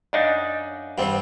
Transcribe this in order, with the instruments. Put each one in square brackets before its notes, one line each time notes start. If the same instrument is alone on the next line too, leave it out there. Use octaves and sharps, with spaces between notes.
[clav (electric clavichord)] F#2 D4 D#4 [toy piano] D5 D#5 F5
[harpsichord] G2 G3 C4 [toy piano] G4 F#5